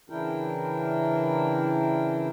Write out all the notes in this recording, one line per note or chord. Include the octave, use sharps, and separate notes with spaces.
C#3 E3 D4 E4 A#4 G5